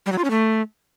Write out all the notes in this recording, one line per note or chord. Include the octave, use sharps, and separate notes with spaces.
G3
F#3
F4
C#4
A3